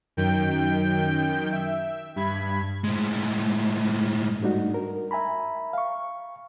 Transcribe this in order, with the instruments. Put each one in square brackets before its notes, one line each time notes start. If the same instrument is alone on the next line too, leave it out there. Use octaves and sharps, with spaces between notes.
[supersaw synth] F#2 D#3 G5 G6
E5
G2 B5 G#6
[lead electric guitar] A2 G#3
[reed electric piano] G#2 G3 A3 D4 D#4 F#4
A#4
E5 G#5 A#5 B5
F5 C#6